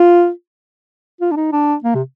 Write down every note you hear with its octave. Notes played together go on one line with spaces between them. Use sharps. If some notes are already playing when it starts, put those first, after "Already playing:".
Already playing: F4
F4
D4
D#4
D4
A#3
C3